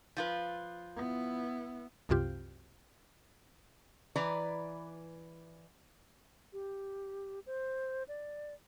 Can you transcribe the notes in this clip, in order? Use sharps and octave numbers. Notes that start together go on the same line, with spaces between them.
F3 F4 B4
B3 E4
C2 F#2 C3 F4 G4
E3 B4 D5 A#5
G4
C5
D5